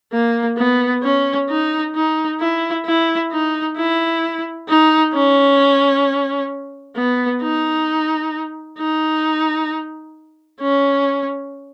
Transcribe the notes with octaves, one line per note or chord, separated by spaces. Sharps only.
A#3
B3
C#4
D#4
D#4
E4
E4
D#4
E4
D#4
C#4
B3
D#4
D#4
C#4